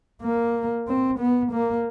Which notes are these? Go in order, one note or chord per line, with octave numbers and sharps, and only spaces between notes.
A#3
C4
B3
A#3